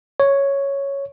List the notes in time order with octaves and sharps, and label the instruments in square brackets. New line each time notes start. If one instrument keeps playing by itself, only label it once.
[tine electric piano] C#5